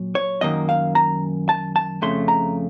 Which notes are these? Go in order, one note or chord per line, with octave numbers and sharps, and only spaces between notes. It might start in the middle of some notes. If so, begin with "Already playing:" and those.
Already playing: A#2 F#3
C#5
F#2 D#3 A#3 D#5
F5
A#5
A5
A5
F2 C#3 A3 C6
A#5